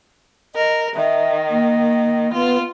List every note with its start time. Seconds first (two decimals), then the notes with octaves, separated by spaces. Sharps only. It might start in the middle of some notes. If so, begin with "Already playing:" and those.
0.55 A#4 D#5
0.96 D#3 E5
1.50 A#3
2.33 B3 F4